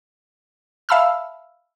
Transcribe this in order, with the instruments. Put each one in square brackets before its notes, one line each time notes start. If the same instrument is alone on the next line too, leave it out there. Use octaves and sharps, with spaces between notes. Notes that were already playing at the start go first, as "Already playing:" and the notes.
[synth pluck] E5 F5 A5 B5 E6 F6